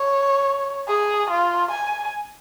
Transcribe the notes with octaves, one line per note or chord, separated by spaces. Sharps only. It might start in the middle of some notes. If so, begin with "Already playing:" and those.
Already playing: C#5
G#4
F4
G#5